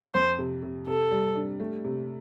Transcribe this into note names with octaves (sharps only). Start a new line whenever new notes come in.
F2 C5
C3
C3
C3 A4
G3
D4
A3
C3